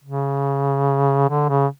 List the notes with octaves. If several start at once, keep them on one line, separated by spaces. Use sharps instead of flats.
C#3
D3
C#3